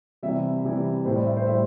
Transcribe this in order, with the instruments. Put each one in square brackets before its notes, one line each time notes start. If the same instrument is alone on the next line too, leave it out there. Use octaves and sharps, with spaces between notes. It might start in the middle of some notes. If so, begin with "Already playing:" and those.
[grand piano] C3 E3 G3 E5
C3 E3 G3
A2 G3 C5
D5
E5
C5
A2 G3 E5